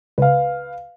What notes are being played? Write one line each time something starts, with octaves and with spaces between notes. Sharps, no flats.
C#2 B4 F5